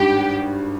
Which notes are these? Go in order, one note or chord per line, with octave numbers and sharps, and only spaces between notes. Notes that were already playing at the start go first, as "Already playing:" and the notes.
Already playing: G#1 G2 D#3 G4